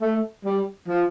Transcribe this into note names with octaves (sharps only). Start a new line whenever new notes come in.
A3
G3
F3